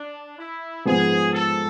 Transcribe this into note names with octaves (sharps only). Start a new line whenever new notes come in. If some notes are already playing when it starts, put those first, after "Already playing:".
Already playing: D4
E4
G#2 F3 G#3 B3 G#4
A4